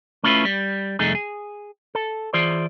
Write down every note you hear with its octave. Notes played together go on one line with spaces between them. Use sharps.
A3 C#4 E4 F4 A#4 B4
G3
C2 F2 A3 D#4 G#4
G#4
A4
E3 F4 G#4 C5 D5